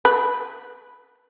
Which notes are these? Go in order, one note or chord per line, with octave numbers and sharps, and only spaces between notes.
B4